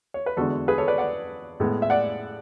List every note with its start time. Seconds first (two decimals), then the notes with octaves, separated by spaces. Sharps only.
0.14 C#5
0.26 B4
0.37 E2 D3 G#3 F#4 A4
0.68 G#4 B4
0.78 A4 C#5
0.88 B4 D5
0.98 D5 F#5
1.60 A2 G#3 B3
1.82 E5
1.90 D5 F#5